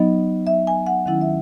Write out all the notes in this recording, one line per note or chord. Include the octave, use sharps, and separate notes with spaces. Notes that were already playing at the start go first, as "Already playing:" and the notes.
Already playing: F#3 B3 D#4 D#5
E5
G#5
F#5
D#3 F#3 C#4 E4 F#5
E5